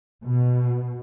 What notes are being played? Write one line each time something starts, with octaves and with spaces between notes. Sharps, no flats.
B2